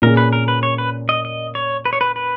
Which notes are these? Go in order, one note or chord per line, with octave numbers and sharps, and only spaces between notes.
A#2 A#3 C#4 G#4 A#4
B4
A#4
B4
C#5
B4
D#5
D#5
C#5
B4
C#5
B4
B4